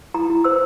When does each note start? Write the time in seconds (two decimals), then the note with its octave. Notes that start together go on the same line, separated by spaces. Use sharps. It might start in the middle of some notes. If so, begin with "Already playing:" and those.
0.14 E4 A#5
0.30 E4
0.44 C5 E6